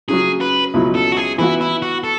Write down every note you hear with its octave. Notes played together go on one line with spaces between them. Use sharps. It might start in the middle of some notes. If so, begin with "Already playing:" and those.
C#3 F#3 C#4 G#4
B4
C#2 B2 F#3 C#4 E4
A4
F#4
G#4
E3 B3 E4 F#4
E4
F#4
A4